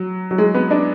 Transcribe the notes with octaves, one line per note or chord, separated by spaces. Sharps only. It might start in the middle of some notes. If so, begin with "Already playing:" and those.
Already playing: F#3
F#3
G#3
B3
D4